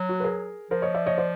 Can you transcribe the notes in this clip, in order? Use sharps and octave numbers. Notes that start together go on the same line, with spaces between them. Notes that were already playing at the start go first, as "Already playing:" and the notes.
Already playing: F#3
F#4
B4
G#4 A#4
F3 A#4 C5
C#5 D#5
D5 E5
C#5 D#5
C5 D5